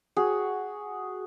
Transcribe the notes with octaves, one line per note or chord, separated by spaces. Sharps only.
F#4 G#4